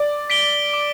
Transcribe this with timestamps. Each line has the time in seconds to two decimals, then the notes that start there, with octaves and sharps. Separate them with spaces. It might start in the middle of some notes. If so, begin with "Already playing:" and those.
Already playing: D5
0.30 B6 D7 G7
0.74 D6